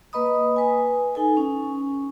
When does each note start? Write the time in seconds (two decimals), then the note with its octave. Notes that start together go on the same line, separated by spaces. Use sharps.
0.13 A#3 B4 D#5 B5 D#6
0.56 B4 G#5
1.15 D#4 A4 G#5
1.37 C#4